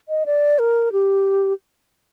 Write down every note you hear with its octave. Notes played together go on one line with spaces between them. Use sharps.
D#5
D5
A#4
G4